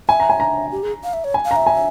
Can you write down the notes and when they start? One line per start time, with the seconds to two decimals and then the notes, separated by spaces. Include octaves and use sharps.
0.09 E5 G#5
0.20 A#5
0.30 G#5
0.40 A#5
0.72 G4
0.83 G#4
1.04 F5
1.13 E5
1.24 C#5
1.34 G#5
1.45 F5
1.51 A#5
1.56 E5
1.67 G#5